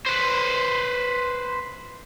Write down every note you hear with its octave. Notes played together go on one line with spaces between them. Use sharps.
B4 C5